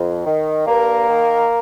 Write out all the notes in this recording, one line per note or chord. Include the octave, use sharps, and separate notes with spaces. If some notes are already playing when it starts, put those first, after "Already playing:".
Already playing: F2
D#3
G2 A#3 A#4
D#3